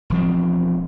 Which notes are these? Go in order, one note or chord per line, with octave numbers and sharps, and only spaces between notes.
E1 F3 C4